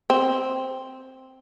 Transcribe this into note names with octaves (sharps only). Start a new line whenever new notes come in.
C4